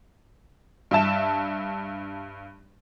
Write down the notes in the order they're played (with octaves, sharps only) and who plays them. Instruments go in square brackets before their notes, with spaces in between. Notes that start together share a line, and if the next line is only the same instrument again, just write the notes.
[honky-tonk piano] G2 E5 A5 E7